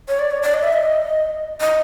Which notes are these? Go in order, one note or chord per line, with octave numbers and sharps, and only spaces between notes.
C#5
D5
C#5
D5
D#5
E5
D#5
D#5